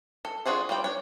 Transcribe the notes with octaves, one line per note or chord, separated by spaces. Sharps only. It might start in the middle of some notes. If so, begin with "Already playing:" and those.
A4
D4 F4 F#4 G#4 C5
G3 F4 A4 G5
D4 C#5